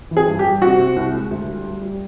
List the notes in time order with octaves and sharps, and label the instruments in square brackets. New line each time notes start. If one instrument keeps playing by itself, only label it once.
[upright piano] E3
G#4
G2
G4
G3
C3 F#4
C3
C2
G#3
D2
G3
G3
G3